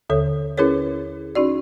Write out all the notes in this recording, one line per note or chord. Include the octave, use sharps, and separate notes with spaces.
D#2 D3 A4 C#5
C#4 E4 G#4 A#4 B4 C#5
C#4 D#4 F#4 D5